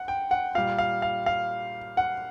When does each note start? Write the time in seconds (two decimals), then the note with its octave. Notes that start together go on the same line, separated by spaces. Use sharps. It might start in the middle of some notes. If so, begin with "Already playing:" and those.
Already playing: F#5
0.08 G5
0.31 F#5
0.55 A#2 G3 F5
0.78 F5
1.02 F5
1.26 F5
1.97 F#5